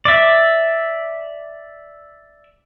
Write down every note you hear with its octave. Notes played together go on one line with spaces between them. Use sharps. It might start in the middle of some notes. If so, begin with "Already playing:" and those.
D5 E5